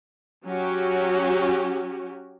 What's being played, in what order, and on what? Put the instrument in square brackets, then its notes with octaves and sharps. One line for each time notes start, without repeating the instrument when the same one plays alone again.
[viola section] F#3 C#4 F#4 G4